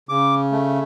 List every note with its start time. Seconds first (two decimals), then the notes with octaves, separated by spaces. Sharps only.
0.09 C#3 D6
0.52 A3